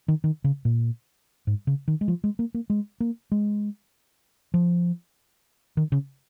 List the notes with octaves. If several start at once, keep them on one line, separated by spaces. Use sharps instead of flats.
D#3
D#3
C#3
A#2
G#2
C#3
D#3
G#3
F3
G#3
A#3
A#3
G#3
A#3
G#3
F3
D#3
C#3